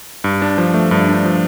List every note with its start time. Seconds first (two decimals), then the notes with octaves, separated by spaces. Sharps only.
0.24 G2
0.42 D4
0.58 F3
0.74 A3
0.91 G2
1.08 D4
1.25 F3